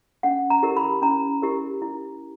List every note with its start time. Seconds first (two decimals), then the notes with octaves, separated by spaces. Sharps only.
0.23 C#4 F#5
0.50 A#5
0.63 E4 G4 A#4
0.77 B5
1.02 C#4 A#5
1.42 E4 G4 A#4
1.82 E4